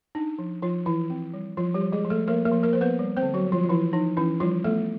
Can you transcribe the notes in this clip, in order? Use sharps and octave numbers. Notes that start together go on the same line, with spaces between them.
D4 D#4
F3
F3 F4
E3 E4
C4
G3
F3 F4
G3 G4
F3
G#3 G#4
F3
A3 A4
F3 A#3 A#4
A#3 A#4
F3
A#3 A#4
F3 C5
B3 B4
G3
C4 C5
D3
F#3 F#4
G3
F3 F4
F4
E3 F3 E4
F3 D#4
E3 C#4 E4
F3 G3 F4
A3 B3 A4